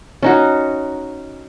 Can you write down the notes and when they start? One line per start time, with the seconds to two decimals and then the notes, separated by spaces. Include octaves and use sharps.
0.22 C#4 D#4 F#4